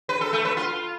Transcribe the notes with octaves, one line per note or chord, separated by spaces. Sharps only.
B4
A4
A3
B4
F4